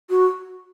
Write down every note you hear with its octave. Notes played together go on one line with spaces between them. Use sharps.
F#4